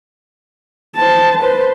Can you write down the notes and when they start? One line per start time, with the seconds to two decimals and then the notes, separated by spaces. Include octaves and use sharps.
0.96 C5 A5
1.42 B4 C5